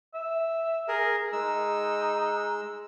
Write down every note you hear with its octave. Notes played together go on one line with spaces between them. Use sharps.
E5
G#4 A#4
G#3 D#4 E6